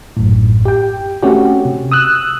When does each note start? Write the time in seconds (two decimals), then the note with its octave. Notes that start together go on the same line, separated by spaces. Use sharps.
0.17 A1 F#2 A2
0.65 G4 G5
1.23 A3 C4 C#4 F#4 G4
1.65 C3
1.92 D#6 E6 F#6